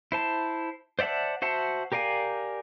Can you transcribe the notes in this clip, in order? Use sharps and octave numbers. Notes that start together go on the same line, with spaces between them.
E4 C5 A5
C5 D5 E5 F#5 A5
F#4 C5 E5 F#5 A5
G4 A#4 D5 F5 G#5